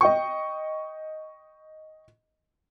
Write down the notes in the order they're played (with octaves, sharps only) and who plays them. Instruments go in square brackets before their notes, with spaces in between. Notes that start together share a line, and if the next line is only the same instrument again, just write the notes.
[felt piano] D#5 G5 C#6